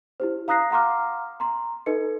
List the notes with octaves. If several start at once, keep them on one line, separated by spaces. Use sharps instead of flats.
E4 G4 C5
F5 A#5 D#6 F#6 A#6 C7
F5 F#5 A#5 C6 D6 F6
A#5 C6
D#4 A4 B4 D#5 C#7